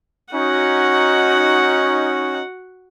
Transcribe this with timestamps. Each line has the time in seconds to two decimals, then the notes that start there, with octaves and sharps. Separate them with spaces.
0.33 C#4 D#4 F#4 F#5